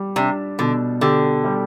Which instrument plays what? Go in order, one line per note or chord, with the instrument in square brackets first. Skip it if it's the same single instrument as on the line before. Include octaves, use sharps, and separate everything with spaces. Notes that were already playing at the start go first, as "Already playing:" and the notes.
Already playing: [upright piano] G3
[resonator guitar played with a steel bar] C3 [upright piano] D4
[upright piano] B2 [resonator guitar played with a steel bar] D3
[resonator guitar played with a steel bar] D3 [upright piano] G4
[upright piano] G3